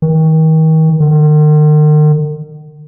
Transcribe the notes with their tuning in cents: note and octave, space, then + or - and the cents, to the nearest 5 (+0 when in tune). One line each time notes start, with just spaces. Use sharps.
D#3 +35
D#3 -45